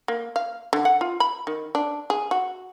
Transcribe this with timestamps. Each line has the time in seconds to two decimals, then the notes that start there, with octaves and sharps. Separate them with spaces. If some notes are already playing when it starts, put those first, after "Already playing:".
0.08 A#3
0.36 F5
0.73 D3
0.85 F#5
1.01 F4
1.20 B5
1.47 D#3
1.75 D4
2.10 G#4
2.31 F#4